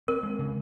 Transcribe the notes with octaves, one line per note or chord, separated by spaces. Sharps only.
C4 A#4
G#3
C#3